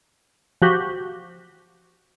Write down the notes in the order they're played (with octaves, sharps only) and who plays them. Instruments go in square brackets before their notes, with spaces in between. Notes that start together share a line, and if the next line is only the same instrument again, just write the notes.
[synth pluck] F3 F#4 G4